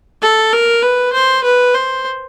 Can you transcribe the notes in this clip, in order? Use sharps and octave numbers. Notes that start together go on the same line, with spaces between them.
A4
A#4
B4
C5
B4
C5